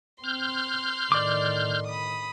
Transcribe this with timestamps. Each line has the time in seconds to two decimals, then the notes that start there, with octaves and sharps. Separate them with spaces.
0.24 C4 C6 F6 G6
1.12 A2 D#3 D5 D6
1.87 B5 D#6